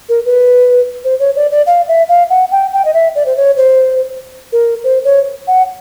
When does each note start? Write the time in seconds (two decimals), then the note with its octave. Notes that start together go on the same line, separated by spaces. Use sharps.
0.09 A#4
0.25 B4
1.04 C5
1.20 C#5
1.36 D5
1.51 D5
1.67 F5
1.88 E5
2.09 F5
2.30 F#5
2.51 G5
2.73 G5
2.85 D#5
2.94 E5
3.15 D5
3.26 C5
3.37 C#5
3.57 C5
4.52 A#4
4.84 C5
5.04 C#5
5.47 F#5